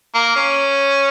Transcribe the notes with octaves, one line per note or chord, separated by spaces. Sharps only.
A#3
C#4